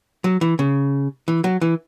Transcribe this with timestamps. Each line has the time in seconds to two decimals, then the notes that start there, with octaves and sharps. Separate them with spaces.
0.24 F#3
0.41 E3
0.59 C#3
1.28 E3
1.44 F#3
1.61 E3